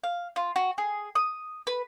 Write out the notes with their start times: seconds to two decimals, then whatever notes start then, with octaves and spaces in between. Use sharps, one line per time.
0.04 F5
0.36 F4
0.56 F#4
0.78 G#4
1.15 D#6
1.67 B4